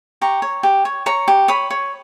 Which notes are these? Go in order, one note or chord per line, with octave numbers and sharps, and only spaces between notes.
G4 A#5 C#6
C#5
G4
C#5
C#5 A#5 C#6
G4
C#5 B5 D#6
C#5